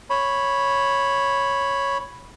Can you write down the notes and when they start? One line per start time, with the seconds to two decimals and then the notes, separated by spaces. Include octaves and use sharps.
0.10 C#5 B5